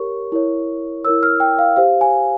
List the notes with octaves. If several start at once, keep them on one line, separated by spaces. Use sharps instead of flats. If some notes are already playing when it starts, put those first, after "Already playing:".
Already playing: G4 A#4 C#5 C#6
E4 A#4 C#5
E4 A#4 C#5 E6
F6
G5
F5
G4 C5 F5
G#5